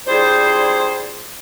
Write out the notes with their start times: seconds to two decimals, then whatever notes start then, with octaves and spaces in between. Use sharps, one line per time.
0.07 G3 D4 E4 F4 G#4 C5